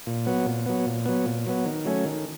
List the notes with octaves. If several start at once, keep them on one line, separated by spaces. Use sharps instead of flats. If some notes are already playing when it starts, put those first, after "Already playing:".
A#2
F#3 B3
A#2
F#3 B3
A#2
F#3 B3
A#2
F#3 B3
D#3
F#3 A3 C#4
D#3